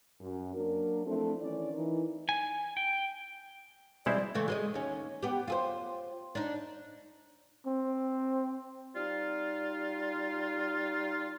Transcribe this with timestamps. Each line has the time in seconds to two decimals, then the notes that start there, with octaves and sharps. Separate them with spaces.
0.21 F#2
0.54 F#3 A#3 D4 A#4
1.05 F3 A3 C4 D4 E4 A4
1.42 D#3 E3 C#4 D5
1.74 E3 D#4 A#4
2.29 G#5
2.77 G5
4.06 B2 G3 G#3 C4 E4 C5 D5
4.34 C#3 E3 A3
4.48 G#3 C5 D#5
4.74 D#2 C#4
5.22 B3 G4
5.48 F4 G#4 C5
6.35 D4 D#4
7.66 C4
8.95 G3 D#4 F4